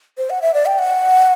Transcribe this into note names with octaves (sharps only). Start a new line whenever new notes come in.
C5
F#5
E5
D5
G5
F#5